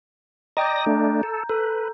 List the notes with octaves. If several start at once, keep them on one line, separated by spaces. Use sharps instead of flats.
D5 D#5 G5 A#5 D6 D#6 G6 A#6
A3 D4
A4
A4 B4